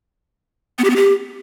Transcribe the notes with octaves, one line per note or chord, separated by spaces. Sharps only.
B3
G4
B3
G4